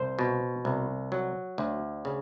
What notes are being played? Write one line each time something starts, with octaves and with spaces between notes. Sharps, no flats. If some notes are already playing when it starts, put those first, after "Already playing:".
Already playing: C2 C5
B2
C2
F#3
D2
C#3